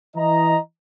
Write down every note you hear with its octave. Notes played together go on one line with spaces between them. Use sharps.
E3 D#5 A#5